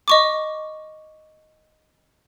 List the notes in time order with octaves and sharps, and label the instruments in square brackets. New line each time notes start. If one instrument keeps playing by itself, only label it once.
[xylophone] D#5 C#6 D6